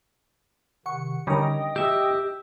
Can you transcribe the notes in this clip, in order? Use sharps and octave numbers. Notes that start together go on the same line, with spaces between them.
C3 D#3 F#5 C#6
D3 G3 C#4 D#4 A#4 D#5 G5 D#6
G4 E5 E6